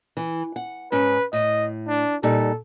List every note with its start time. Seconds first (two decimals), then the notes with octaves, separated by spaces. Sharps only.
0.17 E3
0.56 F#5
0.92 G#2 C#4 B4
1.33 A2 D#5
1.88 D4
2.23 A#2 G3 D#4 A4